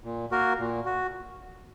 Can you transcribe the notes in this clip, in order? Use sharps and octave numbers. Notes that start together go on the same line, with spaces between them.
A#2
A#3 F#4 A#4
A#2
F#4